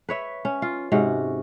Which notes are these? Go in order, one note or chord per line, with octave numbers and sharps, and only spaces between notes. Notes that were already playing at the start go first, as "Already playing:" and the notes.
B4 C#5 E5
C#4
F4
G#2 C3 C#4 F#4